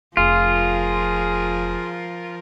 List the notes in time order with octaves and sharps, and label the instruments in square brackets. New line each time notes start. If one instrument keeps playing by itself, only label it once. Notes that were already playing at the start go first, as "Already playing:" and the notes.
[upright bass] F1 [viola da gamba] F3 A#4 [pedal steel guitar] F4 [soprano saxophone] G#4